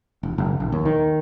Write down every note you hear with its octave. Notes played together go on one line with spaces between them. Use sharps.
E1
F#1
A#1
D#2
D#3